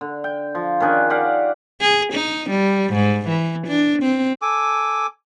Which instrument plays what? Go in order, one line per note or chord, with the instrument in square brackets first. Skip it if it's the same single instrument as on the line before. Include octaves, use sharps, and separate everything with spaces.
[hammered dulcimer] D3
G5
F3
D#3 C#4 D4 G#4
G4 D5 F5 F#5
[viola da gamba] G#4
D#4
G3
G#2
E3
D4
C4
[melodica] A4 G#5 D6